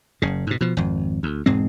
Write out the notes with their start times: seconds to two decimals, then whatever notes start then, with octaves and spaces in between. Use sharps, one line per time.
0.22 F#1 C#3
0.47 G#2 B2
0.61 B2 F3
0.77 G#1 F2
1.23 D2
1.46 E1 G#2 G#3 C4